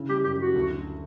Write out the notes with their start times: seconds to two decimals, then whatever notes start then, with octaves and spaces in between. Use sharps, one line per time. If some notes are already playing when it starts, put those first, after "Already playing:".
Already playing: C#3 E4
0.09 G3 G4
0.24 F#2 G4
0.39 F#2 F#4
0.55 D2
0.70 D3